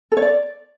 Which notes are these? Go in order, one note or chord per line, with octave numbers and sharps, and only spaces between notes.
A4
C#5
D5